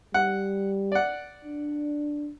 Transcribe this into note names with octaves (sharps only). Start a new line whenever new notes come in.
G3 F#5
D5 F#5
D4